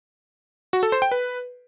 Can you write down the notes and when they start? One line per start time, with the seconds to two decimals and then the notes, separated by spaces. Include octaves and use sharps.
0.73 F#4
0.83 A4
0.92 C5
1.02 G5
1.12 B4